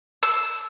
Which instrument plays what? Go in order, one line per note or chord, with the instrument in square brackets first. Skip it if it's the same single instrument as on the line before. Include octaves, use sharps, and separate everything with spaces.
[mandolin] E6